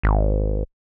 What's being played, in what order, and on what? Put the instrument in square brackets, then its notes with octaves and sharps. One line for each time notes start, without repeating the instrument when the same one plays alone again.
[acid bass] G#1